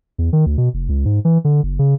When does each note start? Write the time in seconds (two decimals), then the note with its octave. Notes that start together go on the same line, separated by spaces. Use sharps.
0.18 E2
0.33 D#3
0.46 D2
0.58 B2
0.74 F1
0.89 C#2
1.05 G#2
1.25 E3
1.45 D3
1.63 F#1
1.79 C#3